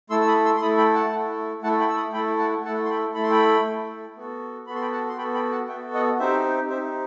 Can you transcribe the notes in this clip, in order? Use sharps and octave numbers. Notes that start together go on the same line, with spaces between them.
A3 E4 A4 C6 E6
E6
B5 D#6
C6 E6
C6
A3 E4 A4 B5 D#6
G5 B5
F#5 A5
A3 E4 A4
A3 E4 A4 F#5 A5
G5 B5
E6
B5 D#6
A3 E4 A4 G5 B5
F#5 A5
A3 E4 A4 F#5 A5
C6
G5 B5
A3 E4 A4 B5
C6
G5 B5
A3 E4 A4
B3 F#4 A4
B3 F#4 A4 B5
C6
G5 B5
F#5 A5
C6
B3 F#4 A4 G5 B5
G5 B5
F#5 A5
B3 F#4 A4 E5 G5
D#5 F#5
C4 D#4 G4 C5 E5
C4 D#4 G4 C5 E5